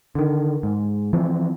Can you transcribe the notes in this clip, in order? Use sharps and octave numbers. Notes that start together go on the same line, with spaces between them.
D3 D#3
G#2
E3 F3 C4